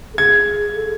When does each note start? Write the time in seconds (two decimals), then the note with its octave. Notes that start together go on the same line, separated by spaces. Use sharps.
0.14 A4
0.18 G#4 G#6
0.75 A4